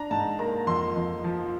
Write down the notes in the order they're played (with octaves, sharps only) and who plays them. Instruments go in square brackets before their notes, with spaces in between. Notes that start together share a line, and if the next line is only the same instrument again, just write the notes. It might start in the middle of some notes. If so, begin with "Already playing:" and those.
Already playing: [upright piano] D4 A#5
G#2 A5
A#3 A#5
F2 C6
F2
F3